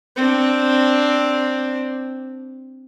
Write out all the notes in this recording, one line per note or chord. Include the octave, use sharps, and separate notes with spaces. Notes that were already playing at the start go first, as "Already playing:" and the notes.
C4 D4